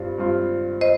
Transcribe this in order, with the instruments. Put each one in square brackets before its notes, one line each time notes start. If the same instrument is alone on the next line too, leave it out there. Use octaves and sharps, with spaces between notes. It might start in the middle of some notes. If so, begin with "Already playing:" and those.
Already playing: [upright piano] G2 G3 C4 F4
G2 G3 C4 F4
[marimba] C5 D#5